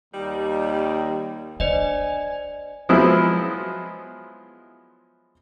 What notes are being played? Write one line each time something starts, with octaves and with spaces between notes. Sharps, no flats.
D#2 G3 D#4
D4 C5 D5 D#5 G#5
F3 F#3 G#3 B3 E4